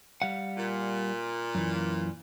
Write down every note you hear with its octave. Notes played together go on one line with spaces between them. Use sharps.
G3 F5 F#5
A#2
F#2 E3